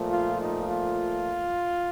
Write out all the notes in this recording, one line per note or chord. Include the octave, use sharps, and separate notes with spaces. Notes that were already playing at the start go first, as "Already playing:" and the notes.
Already playing: A#2 F3 A3
F4
D#4
F4